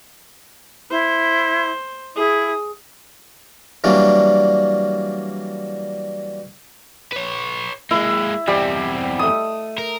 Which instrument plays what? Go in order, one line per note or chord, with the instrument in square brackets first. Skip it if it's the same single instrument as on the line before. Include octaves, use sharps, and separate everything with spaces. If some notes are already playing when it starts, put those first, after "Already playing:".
[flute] E4 [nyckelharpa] C5
[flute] E4 [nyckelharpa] G#4
[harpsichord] E3 F#3 G3 A#3 D4
[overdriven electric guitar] B4 C#5
[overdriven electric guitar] G#3 A#3 [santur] E4
[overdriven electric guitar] E2 C4 [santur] G3
[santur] A3 D#6
[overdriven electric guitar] A#4